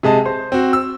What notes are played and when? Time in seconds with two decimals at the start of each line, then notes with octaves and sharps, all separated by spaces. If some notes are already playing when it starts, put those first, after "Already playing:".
0.03 C3 G#3 D#5 A5
0.26 C5
0.52 C4 F#4
0.73 E6